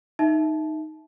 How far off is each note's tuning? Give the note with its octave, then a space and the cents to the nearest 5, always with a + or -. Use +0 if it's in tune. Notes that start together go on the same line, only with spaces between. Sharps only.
D#4 +0 E5 +0 A5 -25